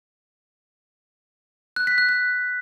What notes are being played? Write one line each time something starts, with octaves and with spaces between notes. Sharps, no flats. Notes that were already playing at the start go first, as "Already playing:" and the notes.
F#6
B6
F#6
F#6